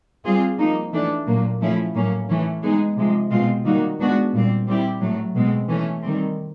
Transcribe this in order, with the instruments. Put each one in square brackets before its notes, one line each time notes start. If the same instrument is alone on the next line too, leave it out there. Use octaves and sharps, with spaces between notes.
[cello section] G3 C4 F4 G#4
F3 A#3 D#4
E3 A3 D4
A#2 F#3 A#3
F3 A3 C#4 E4
A2 F#3 A#3 C#4
E3 A3 C#4
G#3 B3 D#4 G#4
C3 F3 G#3
B2 G#3 C4 F4
D#3 G3 A#3 D#4 F#4
G#3 B3 D4 F#4
A#2 G3 C4
G3 C4 E4 G4
A2 F#3 A3
B2 G#3 C4
E3 A3 C#4
D#3 G3 C4